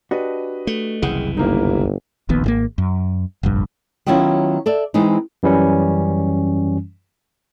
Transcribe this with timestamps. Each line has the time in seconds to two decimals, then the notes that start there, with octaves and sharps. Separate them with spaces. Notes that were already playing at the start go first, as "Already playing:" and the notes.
0.11 D4 F#4 G4 B4 D#5
0.67 A3
1.02 F#1 C2 E3 G#4 F#5 G5
1.37 G1 G3 A#3 D#4 E4
2.29 D#1 A#1 D#2 B3
2.44 G#1 D3 A#3
2.78 F#2
3.43 F1 A#1 G2
4.06 D#3 F#3 B3 C#4 E4 F4
4.66 A4 D5 E5
4.94 E3 G#3 C4 D#4
5.43 F#2 E3 G3 C#4